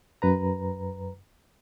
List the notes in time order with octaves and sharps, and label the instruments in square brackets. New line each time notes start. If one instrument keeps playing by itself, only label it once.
[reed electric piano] F#2 B4 A#5